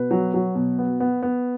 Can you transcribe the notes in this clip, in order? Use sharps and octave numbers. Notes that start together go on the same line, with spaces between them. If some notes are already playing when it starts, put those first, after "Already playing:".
Already playing: B2 B4
F#3
F#3
B2
B3
B3
B3